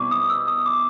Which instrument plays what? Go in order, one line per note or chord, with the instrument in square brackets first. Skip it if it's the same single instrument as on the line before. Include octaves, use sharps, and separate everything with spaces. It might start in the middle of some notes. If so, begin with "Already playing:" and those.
Already playing: [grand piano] B2 G3 C4 E4 [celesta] C#6 D6
[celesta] D#6
E6
D#6
D6